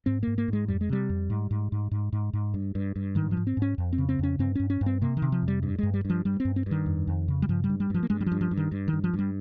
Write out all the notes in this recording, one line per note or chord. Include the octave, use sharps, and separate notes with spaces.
G#2 C4
G#2 A#3
A#3
G#2 G#3
F2 G3
G#3
C3 G3
F2
G#2
G#2
G#2
G#2
G#2
G#2
G2
G2
G2
G#2 D#3
F3
G#2
C4
G#2 C#4
F2
C4
C#3
C4
F2 C#4
G2 C4
G2 C#4
C#4
G2
C4
C3 A#3
D#3
C3
F3
F2
G3
G2
G2 G#3
G3
G2 F3
G2 G3
C4
G2
C4
G2 D#3
F2
F2
C#3
G3
G2 F3
G3
G2
G3
G2 F3
A#3
G2 G#3
G3
F3
G2
F3
G2
D#3
G2
D#3
G2
F3
G2 G3